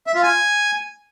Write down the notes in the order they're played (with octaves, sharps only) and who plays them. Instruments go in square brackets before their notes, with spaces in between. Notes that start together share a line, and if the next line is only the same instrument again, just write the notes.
[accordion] E5
F4
G#5